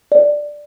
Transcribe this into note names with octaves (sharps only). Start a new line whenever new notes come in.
D5